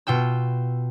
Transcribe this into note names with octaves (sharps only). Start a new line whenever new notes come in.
B2 F4 G5 E6